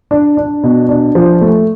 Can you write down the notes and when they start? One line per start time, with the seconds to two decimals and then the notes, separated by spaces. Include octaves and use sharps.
0.11 D4
0.37 D4
0.63 B2
0.89 D4
1.15 F3
1.41 A3